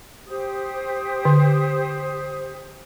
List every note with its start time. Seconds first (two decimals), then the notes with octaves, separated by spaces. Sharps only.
0.27 G4 C5 D#6
1.25 D3